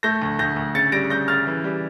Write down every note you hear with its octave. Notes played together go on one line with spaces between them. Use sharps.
A3 G6 A#6
D2
D2 G6 A#6
D2
C#3 A6 C#7
G3 A#6 D7
C#3 G6 A#6
C#3 F6 A6
E3
G3